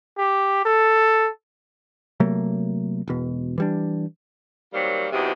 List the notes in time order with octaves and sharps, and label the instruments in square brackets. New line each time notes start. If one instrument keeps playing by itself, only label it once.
[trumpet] G4
A4
[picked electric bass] C3 F#3 A3 A#3
E1 B2
E3 G3 D4
[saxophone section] D#3 F#3 G3 A#3 C4
E2 G#2 C3 F#3 G4